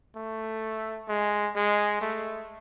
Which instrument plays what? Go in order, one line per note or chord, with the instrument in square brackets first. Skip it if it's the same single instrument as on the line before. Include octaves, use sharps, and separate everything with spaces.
[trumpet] A3
G#3
G#3
A3